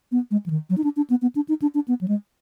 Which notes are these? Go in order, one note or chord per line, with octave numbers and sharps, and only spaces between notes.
B3
G#3
F3
D#3
F#3
D#4
D4
D4
B3
B3
D4
D#4
D4
D4
B3
F#3
G#3